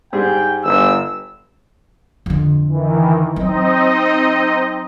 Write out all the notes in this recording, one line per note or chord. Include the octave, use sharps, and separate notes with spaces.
G#2 G3 G#4 G5
G1 E6
F2 D3
D#3 E3
F#3 C4 D#4 D#5